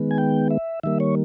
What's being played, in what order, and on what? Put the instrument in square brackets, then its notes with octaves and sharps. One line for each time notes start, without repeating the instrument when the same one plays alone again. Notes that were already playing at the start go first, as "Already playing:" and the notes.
Already playing: [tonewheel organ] D#3 G#3 B3
G#5
G5
E5
D#3 G3 A#3 E5
C#5